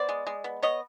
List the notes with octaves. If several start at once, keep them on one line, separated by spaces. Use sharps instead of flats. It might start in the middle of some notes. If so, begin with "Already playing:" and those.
Already playing: B3 C5 D5
G#3
G#3
B3
B3 C#5 D#5